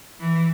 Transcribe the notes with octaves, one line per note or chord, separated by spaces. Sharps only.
E3